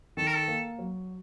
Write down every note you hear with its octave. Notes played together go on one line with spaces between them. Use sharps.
D#3 A4
A#4
A4
A#3
F#3